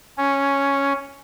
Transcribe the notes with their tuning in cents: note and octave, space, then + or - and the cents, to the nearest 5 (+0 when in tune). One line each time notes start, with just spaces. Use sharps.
C#4 +0